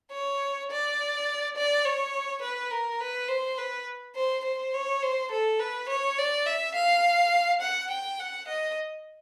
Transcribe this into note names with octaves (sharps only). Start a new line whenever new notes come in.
C#5
D5
D5
C#5
B4
A#4
B4
C5
B4
C5
C5
C#5
C5
A4
B4
C#5
D5
E5
F5
F#5
G5
F#5
D#5